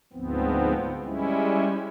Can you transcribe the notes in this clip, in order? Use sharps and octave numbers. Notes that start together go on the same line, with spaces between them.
D2 G#2 F3 B3 C4
G3 G#3 C#4 E4